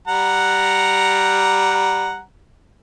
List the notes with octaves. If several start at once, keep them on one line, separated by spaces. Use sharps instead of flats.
G3 F#5 A#5